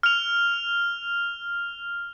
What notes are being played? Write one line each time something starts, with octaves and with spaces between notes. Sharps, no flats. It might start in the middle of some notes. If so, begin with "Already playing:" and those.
F6 F7